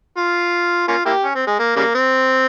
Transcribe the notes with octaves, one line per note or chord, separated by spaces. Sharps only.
F4
A#3 C#4 F4
A#3 E4 G4
C#4
C4
G#3
A#3
C#3 G3 A#3
C4